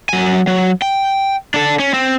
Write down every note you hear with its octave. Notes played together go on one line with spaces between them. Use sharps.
F#3 G#5
F#3
G5
D4 A4
C#4
C4